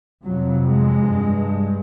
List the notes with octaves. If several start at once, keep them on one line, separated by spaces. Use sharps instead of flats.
F2 C3 F#3
G#3
G2